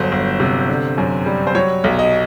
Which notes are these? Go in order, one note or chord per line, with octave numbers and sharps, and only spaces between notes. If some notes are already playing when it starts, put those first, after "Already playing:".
Already playing: G1 F#3 C5
G1
C3
D3
F#2
G3
C5
F#3 C#5
B1
D#5